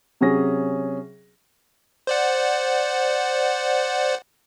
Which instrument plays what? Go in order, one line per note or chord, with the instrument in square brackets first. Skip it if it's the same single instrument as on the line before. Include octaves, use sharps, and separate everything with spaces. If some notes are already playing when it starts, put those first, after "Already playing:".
[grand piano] C3 F#3 C#4 G#4 A#6
[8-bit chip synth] C5 D5 F#5